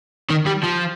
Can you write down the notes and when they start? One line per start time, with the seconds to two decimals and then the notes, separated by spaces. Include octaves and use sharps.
0.30 D#3
0.46 G3
0.63 F3